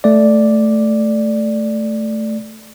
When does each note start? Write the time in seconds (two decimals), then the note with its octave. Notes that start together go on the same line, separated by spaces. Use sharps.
0.04 A3 D5